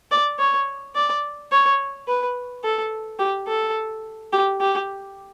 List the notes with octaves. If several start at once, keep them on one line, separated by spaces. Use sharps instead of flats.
D5
C#5
D5
C#5
B4
A4
G4
A4
G4
G4